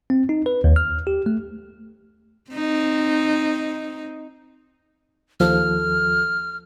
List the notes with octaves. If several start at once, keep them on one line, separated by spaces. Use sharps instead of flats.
C4
D#4
B4
D#2
F6
G4
A3
C4 D#4
D#2 F3 A4 F6